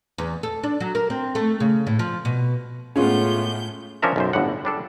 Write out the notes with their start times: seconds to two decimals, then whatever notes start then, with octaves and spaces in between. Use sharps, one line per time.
0.18 E2
0.43 A4
0.63 D4
0.80 F#3
0.95 A#4
1.10 C4
1.35 A3
1.60 C#3
1.87 A2
1.99 F3
2.25 B2
2.96 A2 G#3 B3 C#4 F4 G6
4.02 F3 C#4 D4 A#4 E5 A#5
4.16 B1 F#2 C5
4.33 G1 A2 D3 F#5
4.65 G3 D4 A4